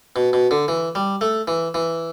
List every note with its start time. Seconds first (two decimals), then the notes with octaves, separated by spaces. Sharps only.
0.16 B2
0.33 B2
0.51 D3
0.68 E3
0.95 G3
1.21 A3
1.48 E3
1.74 E3